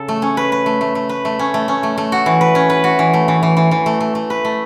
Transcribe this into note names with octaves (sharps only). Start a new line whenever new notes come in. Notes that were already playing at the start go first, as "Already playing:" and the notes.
Already playing: C#3 A4
A3
C#4
B4
B4
A3
A3
A3
B4
A3
C#4
A3
C#4
A3
A3
F#4
E3
B4
C#4
B4
F#4
E3
A3
E3
E3
E3
E3
A3
A3
A3
B4
A3